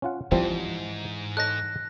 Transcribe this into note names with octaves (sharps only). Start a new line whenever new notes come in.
C#4 F4 F#5
G#2 E3 F3 G3 C4
A4 C#5 D#5 F#6 A#6